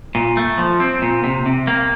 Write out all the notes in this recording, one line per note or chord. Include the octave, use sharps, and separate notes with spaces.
A#2
A3
F3
C4
A#2
C3
C3
A#3